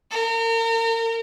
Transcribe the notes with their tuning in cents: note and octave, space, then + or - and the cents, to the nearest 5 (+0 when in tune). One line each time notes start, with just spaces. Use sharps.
A#4 -35